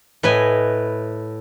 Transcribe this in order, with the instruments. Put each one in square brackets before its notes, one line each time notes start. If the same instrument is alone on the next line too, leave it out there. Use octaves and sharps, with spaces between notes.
[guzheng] A2 B4 D#5 G#5